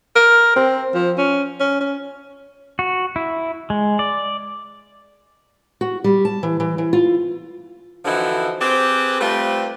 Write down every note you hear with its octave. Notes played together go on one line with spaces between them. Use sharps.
A#4
C4
F3
C#4
C#4
C#4
F#4
E4
G#3
D5
F#4
G3
A5
E3
E3
E3
F4
D3 E3 F3 D#4 E4 F#4
C4 G4 G#4 B4 C5
G3 A3 C4 F4 A4 B4